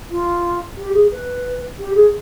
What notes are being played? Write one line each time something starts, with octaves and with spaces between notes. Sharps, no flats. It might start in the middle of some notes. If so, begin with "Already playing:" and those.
F4
G4
G#4
B4
G4
G#4